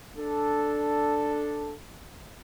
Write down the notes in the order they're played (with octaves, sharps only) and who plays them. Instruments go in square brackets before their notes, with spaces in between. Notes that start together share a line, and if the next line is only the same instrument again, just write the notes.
[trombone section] D4 A4